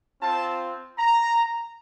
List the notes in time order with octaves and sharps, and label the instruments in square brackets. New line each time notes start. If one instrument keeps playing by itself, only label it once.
[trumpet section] C4 F4 A5
A#5